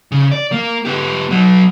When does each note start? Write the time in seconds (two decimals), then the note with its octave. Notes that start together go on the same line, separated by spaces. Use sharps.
0.12 C#3
0.31 D5
0.52 A#3
0.85 B3 G4
1.30 F#3 B3